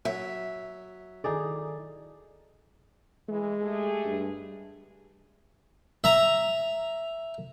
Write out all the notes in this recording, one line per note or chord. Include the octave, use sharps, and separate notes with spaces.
F#3 E5
D#3 D#4 E4 G#4 A4 D5
E3 G#3
A3 G4 G#4
G2
E5 A#5